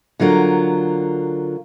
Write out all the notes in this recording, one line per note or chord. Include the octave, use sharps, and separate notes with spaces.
D3 F#3 F4 A#4